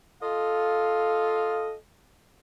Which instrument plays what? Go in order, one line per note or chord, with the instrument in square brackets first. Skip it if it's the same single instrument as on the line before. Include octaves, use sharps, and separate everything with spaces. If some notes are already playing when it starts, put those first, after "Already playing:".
[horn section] F4 A4 D#5 F5